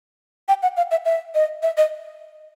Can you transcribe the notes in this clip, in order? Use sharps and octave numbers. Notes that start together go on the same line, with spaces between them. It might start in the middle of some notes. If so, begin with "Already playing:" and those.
G5
F#5
F5
E5
E5
D#5
E5
D#5